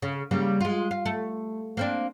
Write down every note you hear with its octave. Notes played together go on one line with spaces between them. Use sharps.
C#3
C#3 G3 A#3
G#3 F4
F4
A3
A#3 C4 D4